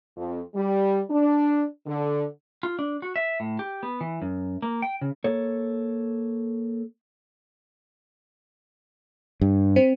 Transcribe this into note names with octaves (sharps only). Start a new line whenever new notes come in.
F2
G3
D4
D3
F4
D4
F#4
E5
A2
G4
B3
E3
F#2
A#3
G5
C#3
A#3 A4 C#5
G2
C4